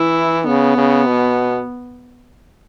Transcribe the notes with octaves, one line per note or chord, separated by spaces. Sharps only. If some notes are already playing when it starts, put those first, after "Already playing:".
Already playing: E3 E4
C#3 B3
C#3
B2